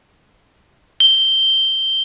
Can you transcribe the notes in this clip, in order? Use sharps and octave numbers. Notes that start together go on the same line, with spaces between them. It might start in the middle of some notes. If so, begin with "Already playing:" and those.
G7